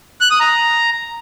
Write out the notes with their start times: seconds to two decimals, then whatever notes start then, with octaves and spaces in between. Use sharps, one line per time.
0.21 F#6
0.31 D#6
0.40 A#5